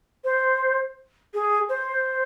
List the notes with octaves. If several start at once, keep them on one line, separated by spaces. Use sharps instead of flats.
C5
G#4
C5